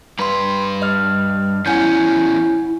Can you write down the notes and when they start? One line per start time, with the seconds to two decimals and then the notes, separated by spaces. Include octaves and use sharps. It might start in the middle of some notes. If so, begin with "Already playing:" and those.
0.19 G2 B4 B5 C6
0.82 D#5 F6
1.66 E2 C#4 E4 F#5 G#5 G6